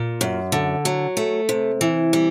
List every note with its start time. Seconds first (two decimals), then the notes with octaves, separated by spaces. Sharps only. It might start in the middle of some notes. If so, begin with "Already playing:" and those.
Already playing: A#2
0.21 F#2
0.52 D3
0.85 F#3
1.17 A3
1.49 C3
1.81 E3
2.13 G3